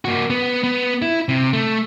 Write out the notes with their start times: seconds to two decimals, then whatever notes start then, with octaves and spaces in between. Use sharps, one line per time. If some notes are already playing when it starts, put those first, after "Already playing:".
0.05 A#3 F#4
0.30 B3
0.64 B3
1.02 E4
1.29 C3
1.53 A3